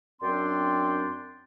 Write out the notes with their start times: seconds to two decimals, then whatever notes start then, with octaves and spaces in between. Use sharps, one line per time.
0.22 F#2 C4 D4 D5 G5 C6